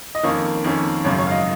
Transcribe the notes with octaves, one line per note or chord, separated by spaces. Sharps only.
D#5
F2 D#3 A#3 C#4 C#5
F2 D#3 A#3 C#4
G#1 F#2 C#3 C#5
C#5
F5
D#5